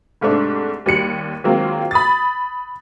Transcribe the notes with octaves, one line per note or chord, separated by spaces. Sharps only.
C2 G#2 A3 D4
D#2 G3 C#7 F#7
D#3 F#3 G#3 A#3 C4 F4
B5 D#6 A6